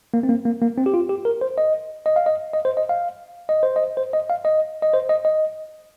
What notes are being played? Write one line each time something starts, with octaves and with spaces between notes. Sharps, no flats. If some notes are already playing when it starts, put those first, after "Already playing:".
A#3
C4
A#3
A#3
A#3
C4
G4
F4
G4
A#4
C5
D#5
D#5
F5
D#5
D#5
C5
D#5
F5
D#5
C5
D#5
C5
D#5
F5
D#5
D#5
C5
D#5
D#5